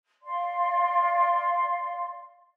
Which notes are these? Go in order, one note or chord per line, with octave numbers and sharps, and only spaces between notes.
D5 F5 C6